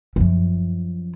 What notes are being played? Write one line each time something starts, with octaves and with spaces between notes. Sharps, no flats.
F#2 F3